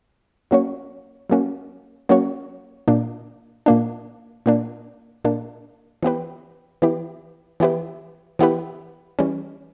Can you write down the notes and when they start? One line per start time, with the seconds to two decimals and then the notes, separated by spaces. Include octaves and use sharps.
0.51 F#3 A#3 C#4 F#4 C#5
1.30 F#3 A#3 C#4 F#4 C#5
2.09 F#3 A#3 C#4 F#4 C#5
2.88 A#2 A#3 D4
3.66 A#2 A#3 D4
4.46 A#2 A#3 D4
5.25 A#2 A#3 D4
6.03 E3 B3 E4 G4 B4
6.82 E3 B3 E4 G4 B4
7.60 E3 B3 E4 G4 B4
8.39 E3 B3 E4 G4 B4
9.19 E3 G3 C#4